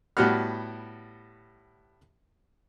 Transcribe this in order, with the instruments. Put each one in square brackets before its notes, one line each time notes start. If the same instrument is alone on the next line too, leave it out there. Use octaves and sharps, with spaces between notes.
[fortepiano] A2 G3 B3 F#4 F#5 F6